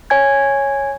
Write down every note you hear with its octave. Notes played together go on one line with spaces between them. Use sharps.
C#5 G#5 G#6